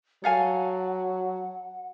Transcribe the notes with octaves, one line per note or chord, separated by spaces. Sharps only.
F#3 A4 F5 F#5 G#5